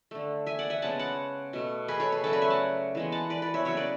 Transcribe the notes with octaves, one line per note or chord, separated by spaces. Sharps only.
D3 A3
E5 G#5
D5 F#5
E5 G#5
C#3 G#3 B3 F#5 A5
F#5 A5
B2 A3
G#4 B4
A4 C#5
G#4 B4
C#3 F#3 A3 A4 C#5
B4 D5
E5 G#5
F#5 A5
E3 G#3 B3
F#5 A5
B4 D5
B4 D5
C#5 E5
C#3 F#3 B3 C#5 E5
B4 D5